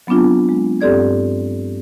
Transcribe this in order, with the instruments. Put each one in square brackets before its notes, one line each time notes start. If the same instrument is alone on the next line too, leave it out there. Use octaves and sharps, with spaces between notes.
[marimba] F#3 B3 C4 D4 F4
G#3
G2 C4 G4 A4 D5 G#6